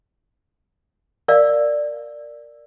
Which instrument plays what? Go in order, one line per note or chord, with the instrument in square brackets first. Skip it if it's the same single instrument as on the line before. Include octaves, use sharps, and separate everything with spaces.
[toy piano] A#4 D5 F5